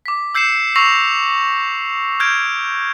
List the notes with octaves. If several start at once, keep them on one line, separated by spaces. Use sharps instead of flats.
D6 B6
E6 G6 C7 C#7 E7
C#6 E6 A#6 C7 F7
F6 G6 G#6 D7